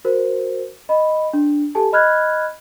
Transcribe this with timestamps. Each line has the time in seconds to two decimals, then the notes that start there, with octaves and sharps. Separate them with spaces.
0.05 F#4 A#4 C5
0.89 D#5 B5
1.33 D4
1.75 G4 A4 G#5 A5
1.93 D#5 B5 F6 F#6 G#6